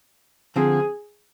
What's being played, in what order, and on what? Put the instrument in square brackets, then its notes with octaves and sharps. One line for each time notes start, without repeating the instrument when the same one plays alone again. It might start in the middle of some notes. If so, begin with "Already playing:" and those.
[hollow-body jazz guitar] D3 F3 C4 [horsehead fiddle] G#4